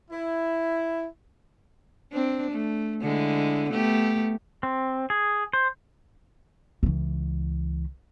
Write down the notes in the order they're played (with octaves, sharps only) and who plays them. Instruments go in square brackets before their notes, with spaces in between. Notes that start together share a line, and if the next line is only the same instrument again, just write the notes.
[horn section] E4
[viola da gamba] C4 D4
A3
D3 G#3 E4
A3 B3 G4
[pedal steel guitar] C4
G#4
C5
[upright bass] C#2 E3